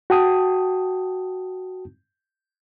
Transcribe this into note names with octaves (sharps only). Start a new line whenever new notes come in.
F#4 G5 A5 D#6